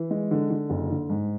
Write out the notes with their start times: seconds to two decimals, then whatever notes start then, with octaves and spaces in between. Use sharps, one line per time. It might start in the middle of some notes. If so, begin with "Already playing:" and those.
Already playing: E3
0.11 G#3
0.31 D3
0.50 D3
0.70 F#1
0.90 D3
1.10 G#2